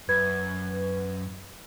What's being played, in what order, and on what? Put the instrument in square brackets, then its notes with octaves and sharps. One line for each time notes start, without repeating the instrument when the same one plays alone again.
[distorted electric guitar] F#2 [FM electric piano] B4 [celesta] G#6